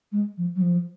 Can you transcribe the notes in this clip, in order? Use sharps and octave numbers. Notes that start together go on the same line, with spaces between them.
G#3
F3
F#3
F3